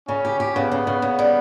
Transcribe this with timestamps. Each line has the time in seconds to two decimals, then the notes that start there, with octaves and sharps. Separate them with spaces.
0.08 C#3 C#4
0.25 G4
0.40 G4
0.55 C#3 B3
0.72 C#3
0.87 C#3
1.02 C#3
1.19 G3